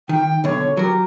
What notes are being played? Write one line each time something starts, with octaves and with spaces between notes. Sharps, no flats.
D#3 G5
B1 D3 C#5
F#3 G4 A#4